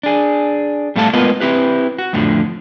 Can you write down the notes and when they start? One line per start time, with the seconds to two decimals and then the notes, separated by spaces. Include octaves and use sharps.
0.03 D4 G#4
0.96 A2 G3 A3 A4 F5 A5
1.13 G#3 B3 F4 A#4 B4 D#5
1.40 C4 E4 G4 B4
1.99 F#4
2.13 F2 A2 D3 F3